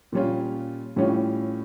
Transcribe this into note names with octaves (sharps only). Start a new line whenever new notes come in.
A#2 G3 C#4 F4
A2 E3 G3 C#4 F4